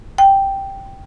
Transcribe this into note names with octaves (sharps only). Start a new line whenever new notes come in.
G5